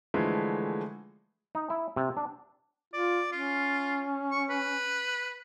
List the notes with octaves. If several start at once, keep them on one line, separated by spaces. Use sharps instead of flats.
D3 E3 F3 G#3 A3
D#4
E4
C3
D4
F4 D5
C#4 F4
C#6
B4